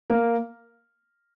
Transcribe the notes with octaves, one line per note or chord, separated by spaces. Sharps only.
A#3 A#4